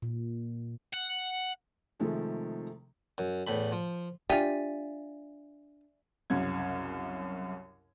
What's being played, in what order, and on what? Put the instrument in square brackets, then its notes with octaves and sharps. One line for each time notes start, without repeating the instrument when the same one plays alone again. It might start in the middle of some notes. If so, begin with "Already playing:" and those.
[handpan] A#2
[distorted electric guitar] F#5
[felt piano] C3 D#3 F3 G#3 A3 G#4
[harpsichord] F#2
E2 A2 B5
F3
[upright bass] D4 [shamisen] F4 G4 [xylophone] D5 E5 G#5
[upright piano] C2 F#2 C#3 G#6